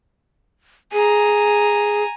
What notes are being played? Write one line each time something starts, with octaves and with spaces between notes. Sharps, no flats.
G#4 G#5 A#5